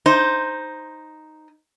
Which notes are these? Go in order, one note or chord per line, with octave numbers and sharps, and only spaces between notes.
D#4 C5